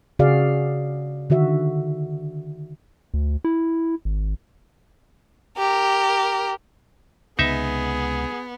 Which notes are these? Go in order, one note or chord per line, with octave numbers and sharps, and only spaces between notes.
C#3 F#4 G#4 D5 F5
D3 D#3 F#4 E5
D2
E4
G#1
G4 A#4
C#2 C3 B3 D#4 G#4 E5